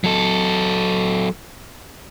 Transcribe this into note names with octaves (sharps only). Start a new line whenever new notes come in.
F#3 A4